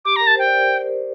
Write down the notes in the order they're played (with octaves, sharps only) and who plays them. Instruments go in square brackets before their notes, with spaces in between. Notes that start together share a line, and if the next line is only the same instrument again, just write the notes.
[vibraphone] G4 [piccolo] D6
[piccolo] A#5
[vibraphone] A#4
[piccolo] A5
[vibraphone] C5 [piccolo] G5
[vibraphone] D5